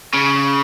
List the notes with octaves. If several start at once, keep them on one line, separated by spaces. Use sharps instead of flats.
C#3